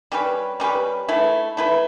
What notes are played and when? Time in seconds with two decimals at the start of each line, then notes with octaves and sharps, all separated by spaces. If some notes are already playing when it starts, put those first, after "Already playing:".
0.12 G3 C#4 G4 B4
0.60 G3 C#4 G4 B4
1.08 A3 E4 B4
1.57 A3 E4 B4